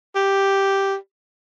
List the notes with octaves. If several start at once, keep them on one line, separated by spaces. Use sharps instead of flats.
G4